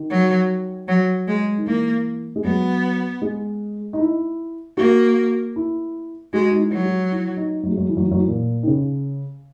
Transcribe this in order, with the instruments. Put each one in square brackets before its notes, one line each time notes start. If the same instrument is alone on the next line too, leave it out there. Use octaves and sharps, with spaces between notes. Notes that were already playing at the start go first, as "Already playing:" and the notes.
Already playing: [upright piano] D#3
[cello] F#3
F#3
G#3
[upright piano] D#3
[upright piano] E3 [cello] A#3
[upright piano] G#3
[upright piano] F#3 [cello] B3
[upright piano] G#3
D#4
E4
[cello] A#3 [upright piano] F#4
[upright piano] E4
[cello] G#3 [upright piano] F#4
[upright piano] D#4
E4
[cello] F#3
[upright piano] F#4
E4
D#4
F#3
G#3
F#3
E3
F#3
E3
F#3
E3
A#2
D#3
C#3